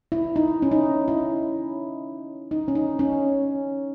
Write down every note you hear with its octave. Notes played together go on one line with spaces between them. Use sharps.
E4
D#4
C#4
D#4
E4
D#4
C#4
D#4
C#4